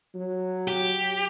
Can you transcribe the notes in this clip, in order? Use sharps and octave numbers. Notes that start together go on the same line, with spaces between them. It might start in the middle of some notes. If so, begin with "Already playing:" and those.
F#3
G4